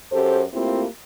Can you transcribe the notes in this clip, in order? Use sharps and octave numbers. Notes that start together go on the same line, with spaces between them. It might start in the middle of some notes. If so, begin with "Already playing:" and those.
F#2 G4 A4 C5
A3 A#3 C4 E4 F4 G4